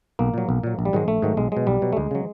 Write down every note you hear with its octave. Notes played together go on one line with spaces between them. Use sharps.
B1 A#3
A#2 F#3
B1
A#2 F#3
A#1
G3
G#2 D#3 F#3 G#3
A#1 A3
G#2 D#3 F#3
B1 G#3
B2 F#3 G#3
B1 G3
B2 F#3
A3
D2 G#3
C#3 F#3